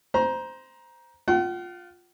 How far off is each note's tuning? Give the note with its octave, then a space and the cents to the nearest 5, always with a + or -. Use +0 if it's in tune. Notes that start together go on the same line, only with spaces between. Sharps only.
C5 -10 A#5 +20
F4 +10 F#5 +45